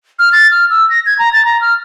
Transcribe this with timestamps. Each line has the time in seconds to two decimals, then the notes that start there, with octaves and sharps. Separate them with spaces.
0.19 F6
0.33 A6
0.51 F6
0.70 E6
0.90 A#6
1.06 G#6
1.19 A#5
1.33 A6
1.45 A#5
1.61 F6